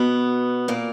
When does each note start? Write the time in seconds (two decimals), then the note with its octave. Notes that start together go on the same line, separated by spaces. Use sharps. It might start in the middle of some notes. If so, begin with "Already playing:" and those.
Already playing: B2 B3
0.68 A#2 A#3